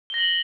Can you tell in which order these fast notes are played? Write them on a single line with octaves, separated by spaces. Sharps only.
G7 A#6 F#7